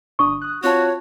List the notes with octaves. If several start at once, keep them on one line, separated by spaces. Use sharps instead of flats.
G1 D4 C#6 D#6
D#6 F#6
C4 F4 F#4 C#5 A5